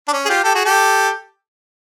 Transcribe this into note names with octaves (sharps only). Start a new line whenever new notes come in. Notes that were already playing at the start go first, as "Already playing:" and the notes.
D4
C#4
G#4
F4 G4
G4 A4
F#4 G#4
G4 A4